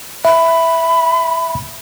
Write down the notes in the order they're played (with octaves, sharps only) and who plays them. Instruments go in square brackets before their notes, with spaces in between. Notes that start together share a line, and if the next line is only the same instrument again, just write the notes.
[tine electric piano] E5 [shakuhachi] B5